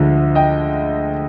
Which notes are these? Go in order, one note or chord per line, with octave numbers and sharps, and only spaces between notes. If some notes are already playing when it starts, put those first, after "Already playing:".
Already playing: D2 D3 F3 G#3
D#5 G5